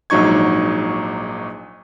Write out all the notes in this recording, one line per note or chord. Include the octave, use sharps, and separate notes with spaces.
A#1 G#2 F#3 D#4 C#6 G#6